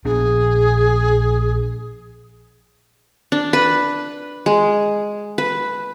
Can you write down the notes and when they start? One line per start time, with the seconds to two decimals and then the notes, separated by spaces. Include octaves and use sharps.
0.05 A#1 B3 D4 G#4
3.32 D4
3.53 B4
4.46 G#3
5.38 B4